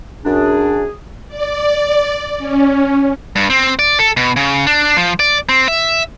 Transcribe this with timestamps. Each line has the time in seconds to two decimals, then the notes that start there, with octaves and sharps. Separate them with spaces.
0.25 F#2 D4 G#4
1.28 D5
2.38 C#4
3.36 G2
3.50 C4
3.79 D5
3.99 A4
4.17 B2
4.36 C#3
4.67 D4
4.97 F3
5.20 D5
5.49 C4
5.68 E5